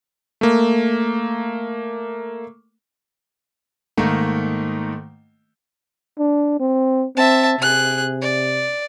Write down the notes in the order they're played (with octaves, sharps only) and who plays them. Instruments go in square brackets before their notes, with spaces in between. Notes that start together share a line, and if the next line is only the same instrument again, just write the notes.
[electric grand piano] A3 A#3
[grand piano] G#2 D#3 A3 A#3
[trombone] D4
C4
[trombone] C4 [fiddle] E5 A5
[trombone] C3 [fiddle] G#4 F#6
[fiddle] D5